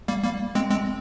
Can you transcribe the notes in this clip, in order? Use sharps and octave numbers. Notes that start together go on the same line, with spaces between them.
G3 A#3
G3 A#3
G#3 C4
G#3 C4